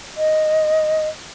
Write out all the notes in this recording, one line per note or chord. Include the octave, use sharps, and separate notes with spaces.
D#5